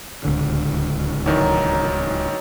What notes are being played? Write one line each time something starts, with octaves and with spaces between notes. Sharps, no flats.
D1 C#2 D3
G#1 D#3 E3 F#3 D#4 A#5